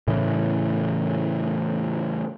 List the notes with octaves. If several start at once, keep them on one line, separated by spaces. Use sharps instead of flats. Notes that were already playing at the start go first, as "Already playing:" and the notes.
A2 C#3 E3